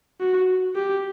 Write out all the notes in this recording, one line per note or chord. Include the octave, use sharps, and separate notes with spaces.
F#4
G4